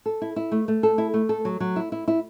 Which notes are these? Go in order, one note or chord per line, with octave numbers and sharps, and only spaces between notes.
A4
E4
E4
A3
A3
A4
E4
A3
A4
F#3
F#3
E4
E4
E4